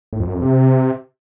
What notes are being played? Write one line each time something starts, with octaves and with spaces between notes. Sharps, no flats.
A2
F2
F#2
F2
C3